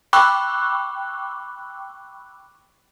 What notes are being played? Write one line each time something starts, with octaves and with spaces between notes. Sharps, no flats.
G5 B5 C#6 D6 E6 F#6